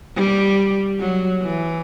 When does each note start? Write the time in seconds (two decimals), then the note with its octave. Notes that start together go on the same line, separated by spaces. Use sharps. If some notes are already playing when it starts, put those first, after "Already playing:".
0.16 G3
1.00 F#3
1.42 E3